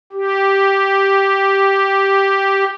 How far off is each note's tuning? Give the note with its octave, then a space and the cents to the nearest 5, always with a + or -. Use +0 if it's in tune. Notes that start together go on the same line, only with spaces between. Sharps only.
G4 -5